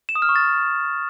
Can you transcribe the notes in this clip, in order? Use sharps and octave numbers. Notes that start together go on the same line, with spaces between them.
E7
D#6
F6
C#6
A6